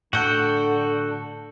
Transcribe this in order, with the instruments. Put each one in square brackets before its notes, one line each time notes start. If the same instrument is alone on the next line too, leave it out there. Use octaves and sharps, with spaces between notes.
[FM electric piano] A2 [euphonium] D3 [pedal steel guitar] F#4 G5 [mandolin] A4 F#5